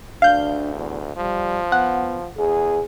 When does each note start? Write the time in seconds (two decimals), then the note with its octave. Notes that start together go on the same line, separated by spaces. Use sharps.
0.22 D2 D4 F5 G6
0.74 E2
1.17 F3 G3
1.72 B3 F#5
2.38 E2 G#4